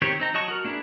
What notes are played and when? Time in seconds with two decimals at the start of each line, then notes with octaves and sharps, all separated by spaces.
0.02 D#3 C4 G4 C#5
0.20 C4 D#4 A#5
0.34 F#3 F#4 D#5 A5 C#6
0.48 F#4 A#4
0.65 A#3 D4 E4 G#4 B4